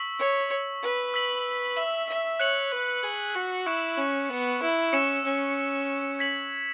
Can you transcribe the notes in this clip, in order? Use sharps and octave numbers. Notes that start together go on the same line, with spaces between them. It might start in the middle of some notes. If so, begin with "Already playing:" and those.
Already playing: C#6 E6 B6 F#7
C#5
B4
E6 B6 F#7
E5
E5
C#5 F#6 C#7 F#7
B4
G#4
F#4
E4 C#6 F#6 E7
C#4
B3
E4
C#4 E6 C#7 E7
C#4
G#6 B6 F#7